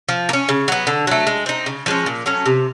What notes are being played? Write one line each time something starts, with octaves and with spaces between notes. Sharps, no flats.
F3
A#3
C#4
C#3
F#3 B3
D3
F#3 A3
G#3
C4 D#4
C#3
F3 G#3 C#4
A#2
F#3 A3 C#4
C3